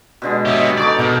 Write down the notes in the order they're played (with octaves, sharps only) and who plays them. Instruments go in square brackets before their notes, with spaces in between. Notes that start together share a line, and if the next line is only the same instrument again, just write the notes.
[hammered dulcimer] B2 D3 G#3
[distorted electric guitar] B3 G4 [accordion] C#5 D#5 E5
[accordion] D3 B3 [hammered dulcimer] D#4 C#5 D6 [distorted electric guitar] D5
[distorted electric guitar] B2 [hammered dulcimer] D#4 A#4